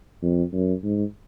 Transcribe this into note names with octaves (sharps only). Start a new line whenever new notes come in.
F2
F#2
G#2